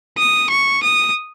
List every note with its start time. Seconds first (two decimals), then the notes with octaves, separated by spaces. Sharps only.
0.18 D#6
0.50 C#6
0.83 D#6